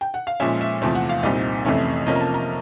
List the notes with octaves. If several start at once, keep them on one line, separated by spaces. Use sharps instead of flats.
G5
F#5
F5
A#2 F3 G#3 C#4 E5
E5
E2 C3 F3 A3 C4
F#5
F5
C2 A#2 G3 C4 D#4 D#5
F2 C3 E3 A3 C#4
C3 F3 A#3 C#4 D#5
A#5
A5
A#5